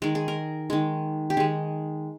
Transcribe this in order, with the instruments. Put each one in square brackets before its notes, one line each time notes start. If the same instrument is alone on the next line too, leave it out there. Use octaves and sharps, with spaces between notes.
[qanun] D#3 G#3 A#4
G#4
A#4
D#3 G#3
G4
D#3 G#3 G#4